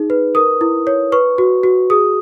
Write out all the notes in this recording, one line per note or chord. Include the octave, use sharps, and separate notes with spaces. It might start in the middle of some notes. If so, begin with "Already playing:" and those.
Already playing: D#4 G#4
B4
A#4 D#6
E4
C#5
B4 C#6
F#4
F#4
G#4 D#6